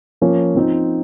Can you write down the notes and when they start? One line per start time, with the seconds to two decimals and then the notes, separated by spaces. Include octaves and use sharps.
0.21 F3 A#3 C#4
0.55 F3 C4 D#4